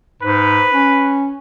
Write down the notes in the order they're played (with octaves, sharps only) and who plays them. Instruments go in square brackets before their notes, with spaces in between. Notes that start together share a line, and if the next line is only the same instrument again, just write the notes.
[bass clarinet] G#2 [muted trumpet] B4
[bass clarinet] C#4